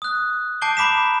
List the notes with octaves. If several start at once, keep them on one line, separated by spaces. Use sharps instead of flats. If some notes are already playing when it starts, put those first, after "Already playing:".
D#6 F#6
A5 D6 G6 C7 D7 G7
A#5 B5 D6 B6 E7